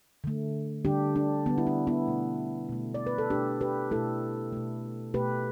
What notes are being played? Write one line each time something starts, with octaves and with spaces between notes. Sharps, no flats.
D3 A3
D3 G3 D4 G4
D4
D3 G3 B3
E4
D4
B3 E4
B2 A3
B2 A3
D5
B4
A4
B2 A3 D4 G4
G4 B4
B2 A3 E4 A4
B2 A3
B2 A3 G4 B4